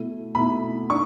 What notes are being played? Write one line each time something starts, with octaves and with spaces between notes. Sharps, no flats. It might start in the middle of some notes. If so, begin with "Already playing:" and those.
Already playing: B2 A3 E4
B2 A3 E4 B5
D4 C#6